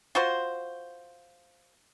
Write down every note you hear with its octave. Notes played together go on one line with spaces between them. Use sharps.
F4 F#4 C5